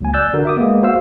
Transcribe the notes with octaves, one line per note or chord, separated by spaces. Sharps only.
C#2 F#3 A#3 G#5
D5 E6 F#6 G6 A6
D3 F#4 A#4
E5 D6 D#6
G#3 A#3 B3
F#4 C5 E5 F5 E6